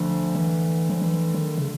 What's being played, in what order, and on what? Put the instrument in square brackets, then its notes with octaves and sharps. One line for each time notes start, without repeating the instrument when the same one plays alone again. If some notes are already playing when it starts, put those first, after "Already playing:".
Already playing: [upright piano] D2 D3 [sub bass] F3
[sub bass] E3
F3
E3
D#3
C#3